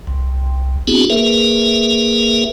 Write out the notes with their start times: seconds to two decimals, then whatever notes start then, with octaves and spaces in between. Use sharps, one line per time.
0.07 C2
0.87 B3 C4 D4 E4 F#4 G#4
1.10 A#3 G#4 A#4 B4 E5